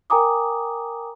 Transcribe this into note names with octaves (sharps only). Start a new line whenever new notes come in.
A#4 G5 G#5 A#5 D6 D#6